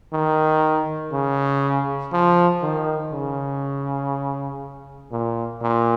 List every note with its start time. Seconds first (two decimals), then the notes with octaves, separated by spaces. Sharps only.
0.13 D#3
1.12 C#3
2.13 F3
2.62 D#3
3.12 C#3
5.11 A#2
5.62 A#2